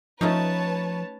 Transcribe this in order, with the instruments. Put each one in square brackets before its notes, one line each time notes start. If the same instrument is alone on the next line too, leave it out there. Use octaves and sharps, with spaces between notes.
[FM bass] F3 [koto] A3 C#4 D#4 [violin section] B4 C#5 A5